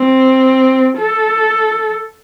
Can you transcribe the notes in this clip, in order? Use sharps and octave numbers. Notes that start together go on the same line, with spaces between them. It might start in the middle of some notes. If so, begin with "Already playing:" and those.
Already playing: C4
A4